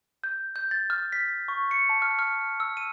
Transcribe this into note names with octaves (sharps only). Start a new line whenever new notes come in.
G6
G6
A6
F6
B6
C#6
C#7
A5
F6
F6
E6
D#7